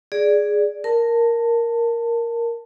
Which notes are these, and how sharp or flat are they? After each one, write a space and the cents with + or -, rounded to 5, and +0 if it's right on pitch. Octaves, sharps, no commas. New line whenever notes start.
G#4 +0 D5 +0
A#4 +0 A5 +20